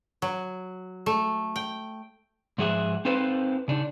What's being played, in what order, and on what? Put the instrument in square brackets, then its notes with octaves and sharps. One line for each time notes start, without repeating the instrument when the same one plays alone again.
[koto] F#3
A3
G5
[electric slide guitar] G#2 F3 G#4 E5 F#5
C4 D#4 A4 B4 C5 F5
C#3 D4 D#4